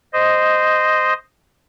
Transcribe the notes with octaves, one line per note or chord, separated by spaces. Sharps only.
C5 D#5